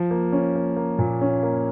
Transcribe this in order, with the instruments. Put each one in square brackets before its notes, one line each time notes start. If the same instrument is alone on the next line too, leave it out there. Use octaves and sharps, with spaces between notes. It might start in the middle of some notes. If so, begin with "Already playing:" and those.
Already playing: [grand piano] F3
A#3
C#4
A#3
A#3
A#2
C#4
A#3